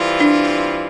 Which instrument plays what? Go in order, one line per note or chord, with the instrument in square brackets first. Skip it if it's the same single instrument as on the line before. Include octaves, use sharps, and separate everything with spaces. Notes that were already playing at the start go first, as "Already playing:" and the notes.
Already playing: [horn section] E3 G3 C4 F4
[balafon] D4